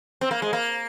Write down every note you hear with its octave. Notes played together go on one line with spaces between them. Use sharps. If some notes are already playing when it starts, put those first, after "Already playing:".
C4
A#3
G#3
A#3